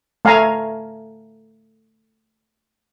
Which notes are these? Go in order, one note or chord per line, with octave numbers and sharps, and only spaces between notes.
A3 F5 G#5 A#5